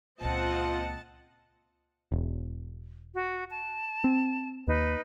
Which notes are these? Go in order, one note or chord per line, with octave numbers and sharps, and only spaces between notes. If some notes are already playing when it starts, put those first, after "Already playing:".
C#2 A#2 C4 F4 D#5 F#5 A5
E1
F#4
A5
C4
D#2 D#4 B4